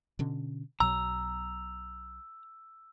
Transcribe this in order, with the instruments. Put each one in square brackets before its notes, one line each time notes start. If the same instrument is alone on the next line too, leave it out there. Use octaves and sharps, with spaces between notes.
[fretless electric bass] B2 D3 C#4
[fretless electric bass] B1 B2 F#3 [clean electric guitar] A#5 [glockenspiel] E6